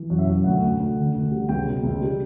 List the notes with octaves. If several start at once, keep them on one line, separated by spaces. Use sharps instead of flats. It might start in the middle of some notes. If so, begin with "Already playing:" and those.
Already playing: E3
F#2
E5
F#2
D2 F#5
D2
D2
D3
D2
G3
C#2 G5
B2
C#2
G3